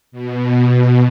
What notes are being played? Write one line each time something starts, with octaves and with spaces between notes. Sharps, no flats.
B2